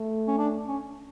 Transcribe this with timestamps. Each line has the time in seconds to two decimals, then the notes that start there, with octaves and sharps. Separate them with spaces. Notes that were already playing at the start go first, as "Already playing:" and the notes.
Already playing: A3
0.28 C#4
0.38 D4
0.69 C#4